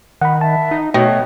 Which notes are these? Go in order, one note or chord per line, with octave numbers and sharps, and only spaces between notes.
D#3 F#5 B5
E5 A5
D#4
B2 A3 C#5 G5